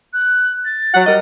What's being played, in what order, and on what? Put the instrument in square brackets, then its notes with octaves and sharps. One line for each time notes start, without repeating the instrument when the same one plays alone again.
[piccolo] F#6
A6
[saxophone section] F#3 F#5
G3 A#4 D#5